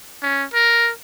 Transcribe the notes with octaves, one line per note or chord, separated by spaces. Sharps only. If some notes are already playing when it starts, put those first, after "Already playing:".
C#4
A#4